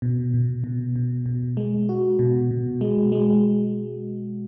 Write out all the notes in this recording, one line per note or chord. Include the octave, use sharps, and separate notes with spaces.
B2
B2
B2
B2
B2
G#3
F#4
B2
B2
G#3
G#3